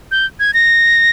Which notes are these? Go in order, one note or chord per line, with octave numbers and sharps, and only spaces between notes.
G6
G#6
A#6